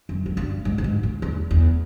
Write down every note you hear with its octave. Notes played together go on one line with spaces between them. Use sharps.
F#2
F#2
G2
G#2
A2
G#2
A2
E2
E2